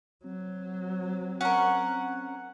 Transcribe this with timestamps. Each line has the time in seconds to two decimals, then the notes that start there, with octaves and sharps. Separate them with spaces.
0.25 F#3 C4
1.41 C#4 A#4 F#5